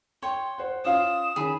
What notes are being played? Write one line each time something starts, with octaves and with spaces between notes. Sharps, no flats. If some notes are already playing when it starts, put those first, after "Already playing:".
C#5 G5 C6
C5 F#5
C#4 F4 F5 D#6 E7
D#3 C#4 G#4 B5